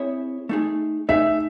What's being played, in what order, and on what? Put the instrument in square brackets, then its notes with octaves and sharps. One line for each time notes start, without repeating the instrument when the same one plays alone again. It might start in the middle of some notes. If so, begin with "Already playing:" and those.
Already playing: [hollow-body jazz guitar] C4 E4 G#4 C#5 E5
A3 D#4 G#4
[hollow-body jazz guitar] A3 D#4 G#4 [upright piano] E5